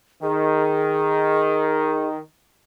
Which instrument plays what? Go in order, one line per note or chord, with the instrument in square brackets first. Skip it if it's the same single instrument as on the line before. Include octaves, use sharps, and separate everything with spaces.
[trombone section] D#3 [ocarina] G#4